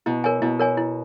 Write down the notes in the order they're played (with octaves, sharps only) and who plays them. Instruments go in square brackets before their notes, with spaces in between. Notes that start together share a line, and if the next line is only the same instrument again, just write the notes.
[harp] B2 [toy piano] E4
[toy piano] A#4 C#5 G#5
[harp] B2 [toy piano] E4
[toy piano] A#4 C#5 G#5
E4